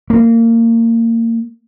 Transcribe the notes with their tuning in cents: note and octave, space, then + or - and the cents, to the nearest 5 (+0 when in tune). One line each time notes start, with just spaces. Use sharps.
A#3 -25